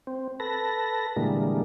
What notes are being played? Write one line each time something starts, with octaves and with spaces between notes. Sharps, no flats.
C4
A4 B4 A#6
A#2 D3 E3 G3 G#3 A#3